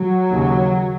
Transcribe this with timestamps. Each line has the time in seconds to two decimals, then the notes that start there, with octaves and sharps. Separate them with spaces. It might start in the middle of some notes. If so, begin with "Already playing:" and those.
Already playing: F#3
0.33 D#2 C#3